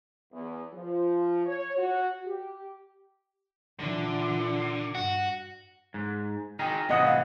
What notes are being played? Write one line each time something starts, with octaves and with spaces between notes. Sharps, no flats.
E2
F3
C#5
F#4
G4
A#2 D3 E3
G2 F#4
G#2
D#4 G#4 A#4 G5
A2 C3 E3 D#5 F#5 D#6
F5